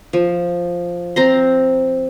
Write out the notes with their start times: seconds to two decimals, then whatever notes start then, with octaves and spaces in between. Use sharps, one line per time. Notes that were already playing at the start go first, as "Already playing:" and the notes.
0.13 F3
1.16 C4 A#5 C6